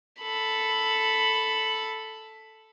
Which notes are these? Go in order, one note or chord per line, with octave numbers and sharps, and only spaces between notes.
A4 B5